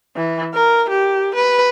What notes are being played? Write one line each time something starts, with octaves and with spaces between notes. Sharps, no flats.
E3
A#4
G4
B4